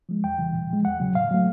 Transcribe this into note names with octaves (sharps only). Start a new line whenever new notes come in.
F3 G#3
E2 G5
C#3 E3 G3
A#2
F3 G#3
E2 F#5
C#3 F#3
A2 F5
F#3 A3